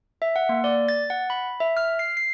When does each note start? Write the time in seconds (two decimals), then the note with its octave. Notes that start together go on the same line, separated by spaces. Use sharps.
0.22 E5
0.36 F#5
0.49 A#3
0.64 D5
0.89 A6
1.10 F#5
1.30 B5
1.60 E5
1.77 F6
1.99 C7
2.17 C7